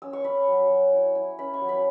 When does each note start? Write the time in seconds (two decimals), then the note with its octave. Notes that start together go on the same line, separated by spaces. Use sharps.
0.02 C#4 E6
0.13 C#6
0.24 C#4 B5
0.48 F#3
0.70 F#3
0.93 E4
1.15 E4
1.39 C#4 B5
1.54 C#6
1.61 F#3
1.69 B5